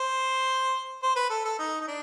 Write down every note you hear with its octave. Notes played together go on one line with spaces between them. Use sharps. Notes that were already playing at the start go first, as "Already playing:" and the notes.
Already playing: C5
C5
B4
A4
A4
D#4
D#4
D4